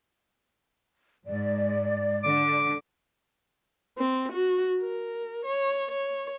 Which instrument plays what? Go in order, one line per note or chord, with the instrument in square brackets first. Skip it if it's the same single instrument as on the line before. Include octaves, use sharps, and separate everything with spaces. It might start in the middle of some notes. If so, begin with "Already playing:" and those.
[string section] G#2 [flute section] D5
[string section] D3 [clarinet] D6
[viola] C4
F#4
A#4
C#5
C#5